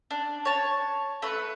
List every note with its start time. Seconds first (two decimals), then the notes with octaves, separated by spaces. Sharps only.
0.11 D4
0.45 C#5 A5
1.22 A3 B4